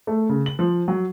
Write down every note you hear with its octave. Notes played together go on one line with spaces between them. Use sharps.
A3
C#3
F#7
F3
F#3